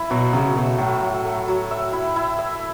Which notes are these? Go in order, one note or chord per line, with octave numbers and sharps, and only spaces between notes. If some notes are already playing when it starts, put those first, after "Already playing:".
Already playing: E4
B2 F#3
C#3 F#3
B2 A3
A2 F#3
F#3
A3
F#3
E5
E4
E4
E5